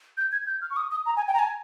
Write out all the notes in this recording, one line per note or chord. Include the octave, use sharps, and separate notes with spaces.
G6
G#6
G6
F6
C#6
D#6
D#6
A#5
G#5
G5
A#5
G#5